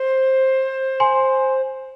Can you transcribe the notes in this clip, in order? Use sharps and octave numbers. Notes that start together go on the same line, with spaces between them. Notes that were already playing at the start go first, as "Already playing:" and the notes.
Already playing: C5
G#5 C6